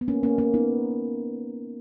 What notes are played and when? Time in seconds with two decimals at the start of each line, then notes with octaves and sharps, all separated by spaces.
0.01 B3
0.08 A#3 C#4
0.23 A#3 C#4
0.38 A#3 C#4
0.54 B3 D#4